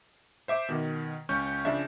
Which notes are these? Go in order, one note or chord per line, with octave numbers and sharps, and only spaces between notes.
C5 E5 D6
B2 D#3
C#2 C#4 C#6 G6
C#3 F3 D4 E5